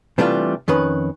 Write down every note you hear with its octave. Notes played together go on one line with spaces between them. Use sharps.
C3 E3 G3 A3 D4 F4
F2 D#3 C#4 B4